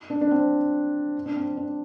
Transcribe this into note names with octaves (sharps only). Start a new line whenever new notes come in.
D4
D4
C4
D4
C4
D4